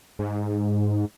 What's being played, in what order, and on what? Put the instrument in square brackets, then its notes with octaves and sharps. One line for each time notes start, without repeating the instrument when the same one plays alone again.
[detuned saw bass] G#2